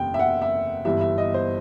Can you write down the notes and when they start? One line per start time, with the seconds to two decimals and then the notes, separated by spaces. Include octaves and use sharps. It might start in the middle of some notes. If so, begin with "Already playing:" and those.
Already playing: F#1 E2 C3 G5
0.14 E5
0.19 F#5
0.42 E5
0.85 G1 G2 E3 G3 E5
1.01 E5
1.18 D#5
1.34 C5